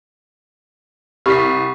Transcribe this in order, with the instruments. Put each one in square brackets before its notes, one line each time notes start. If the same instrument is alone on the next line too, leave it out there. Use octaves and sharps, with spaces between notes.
[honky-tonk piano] C2 B6 [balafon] G4 [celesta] B5 C#6